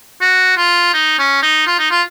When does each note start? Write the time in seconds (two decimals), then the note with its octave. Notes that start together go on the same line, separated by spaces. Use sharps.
0.21 F#4
0.57 F4
0.94 D#4
1.19 C#4
1.42 D#4
1.67 F4
1.79 D#4
1.91 F4